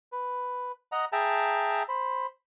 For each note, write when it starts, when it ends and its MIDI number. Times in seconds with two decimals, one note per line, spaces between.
0.12 0.72 71
0.92 1.05 75
0.92 1.05 78
0.92 1.05 82
1.12 1.83 68
1.12 1.83 76
1.12 1.83 79
1.12 1.83 81
1.12 1.83 82
1.88 2.26 72
1.88 2.26 83